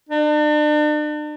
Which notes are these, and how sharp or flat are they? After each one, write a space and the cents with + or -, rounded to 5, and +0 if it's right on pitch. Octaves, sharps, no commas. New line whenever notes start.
D4 +40